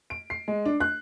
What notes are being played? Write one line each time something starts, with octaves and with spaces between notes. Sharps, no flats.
D7
C7
G#3
D4
F#6